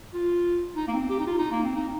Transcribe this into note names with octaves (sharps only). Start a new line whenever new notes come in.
F4
D#4
A#3
C4
G4
D#4
F4
D#4
A#3
C4
D#4